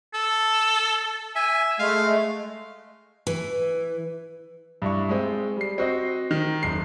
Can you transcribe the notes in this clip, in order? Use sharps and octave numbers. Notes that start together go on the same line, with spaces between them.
A4
E5 G#5
G#3 A3 F5
E3
G2 E4 C#6
G#3 C4
G3 C7
C4 F#4 D#5
D#3
F#1 C7